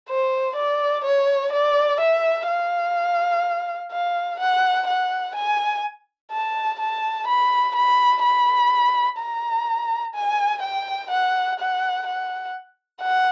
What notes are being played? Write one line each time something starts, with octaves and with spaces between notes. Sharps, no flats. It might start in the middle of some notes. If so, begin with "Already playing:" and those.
C5
D5
C#5
D5
E5
F5
F5
F#5
F#5
G#5
A5
A5
B5
B5
B5
A#5
G#5
G5
F#5
F#5
F#5
F#5